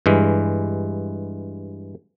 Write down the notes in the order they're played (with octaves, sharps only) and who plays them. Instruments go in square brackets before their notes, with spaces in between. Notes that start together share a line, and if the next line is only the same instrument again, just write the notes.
[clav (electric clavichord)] G2 E3 G#3